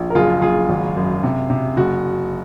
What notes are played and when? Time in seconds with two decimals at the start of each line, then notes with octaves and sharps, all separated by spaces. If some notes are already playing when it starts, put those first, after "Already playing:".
Already playing: A#1
0.10 A#4
0.15 F#1 F4 G#4
0.42 F#1 F4 G#4
0.69 G#1
0.96 F#2
1.23 C3
1.50 C3
1.77 F#1 F#4